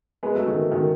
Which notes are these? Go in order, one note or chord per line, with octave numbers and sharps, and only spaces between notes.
G#3 B3
F#3 A3
D#3 F#3
D#3 F#3